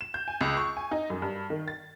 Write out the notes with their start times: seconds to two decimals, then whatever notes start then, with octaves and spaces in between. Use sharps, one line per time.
0.01 E7
0.14 G6
0.28 G#5
0.41 C#2
0.57 C#6
0.77 G#5
0.91 D#4
1.10 F#2
1.22 G2
1.50 D#3
1.68 A6